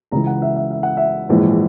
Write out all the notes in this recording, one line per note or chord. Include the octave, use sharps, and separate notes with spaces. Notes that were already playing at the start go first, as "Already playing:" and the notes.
C#2 C#3 E3 A#5
F#5
E5
E5
E5
F#5
E5
A#1 G#2 E3